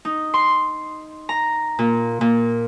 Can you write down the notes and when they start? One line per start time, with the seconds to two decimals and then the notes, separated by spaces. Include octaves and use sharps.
0.05 D#4
0.34 C6
1.29 A#5
1.79 A#2
2.21 A#2